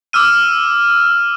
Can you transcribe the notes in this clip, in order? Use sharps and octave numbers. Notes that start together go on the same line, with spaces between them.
D6 E6 F6 D#7